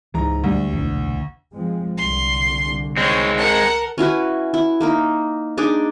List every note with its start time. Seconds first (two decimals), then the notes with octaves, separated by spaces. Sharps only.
0.14 C#2 G#2 E3 A#5
0.44 D2 F#3 G3 D4
0.73 F1 B1 E2
1.54 F3 G#3 C4
1.97 C2 D3 C6
2.97 G#3 C4 C#5
3.38 A4 A#4 F#5
3.98 C#4 E4 F#4 B4
4.54 E4
4.81 A#3 D#4 A#4
5.57 D4 D#4 G#4 D6